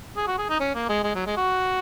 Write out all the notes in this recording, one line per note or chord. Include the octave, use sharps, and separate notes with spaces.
G#4
F#4
G#4
D#4
C#4
A#3
G#3
G#3
F#3
G#3
F#4